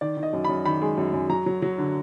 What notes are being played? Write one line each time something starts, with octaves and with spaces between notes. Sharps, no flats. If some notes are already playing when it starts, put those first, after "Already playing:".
D#3 D5
D#3
D#5
F#2
F#2 B5
D#3 B5
G#3
F#2
F#2
F#3 A#5
F#3
F#3
D3